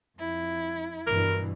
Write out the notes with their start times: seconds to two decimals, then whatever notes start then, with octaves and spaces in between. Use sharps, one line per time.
0.18 F2 E4
1.07 G2 B2 E3 A#4